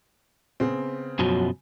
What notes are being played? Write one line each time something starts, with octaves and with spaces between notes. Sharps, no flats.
C#3 B3 C4
F#2 B2 F3 F#3